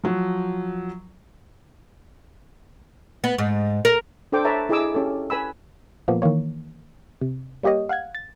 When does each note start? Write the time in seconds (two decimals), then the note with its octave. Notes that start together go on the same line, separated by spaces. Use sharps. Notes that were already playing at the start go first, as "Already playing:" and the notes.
0.04 F3 F#3
3.24 B3
3.38 G#2
3.85 A#4
4.32 D4 A4 C5 G5 D6
4.45 A4 B4 C#5 E5 A5 A#5
4.69 E4 G#4 D#5 G#5 D6 E6
4.94 C#4 G4 A4
5.30 B4 G#5 B5 E6
6.08 A#2 F3 A#3 B3
6.22 D#3 E3 A#3 C#5
7.21 C3
7.63 G3 A#3 G4 C#5 D#5
7.89 F5 F#5 F#6 G#6
8.15 A6